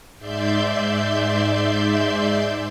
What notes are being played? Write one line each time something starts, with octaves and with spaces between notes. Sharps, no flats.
G#2 D5 E5 C6 G6